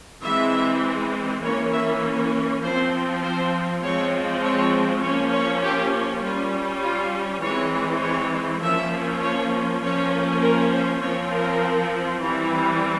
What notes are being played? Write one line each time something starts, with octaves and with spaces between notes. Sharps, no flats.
E3 G#3 C4 E5
E3 A#3 C#4 C#5
E5
F3 C4 C5
C5
F3 G#3 C4 C#5
C#5
F3 A#3 C#4 C#5
C#5
G4
G3 C#4 F4
F4
E3 G#3 C4 C#5
C#5
F3 A#3 C#4 E5
C#5
F3 A#3 C#4 C#5
A#4
C5
F3 C4 C#5
A#4
E3 G3 C4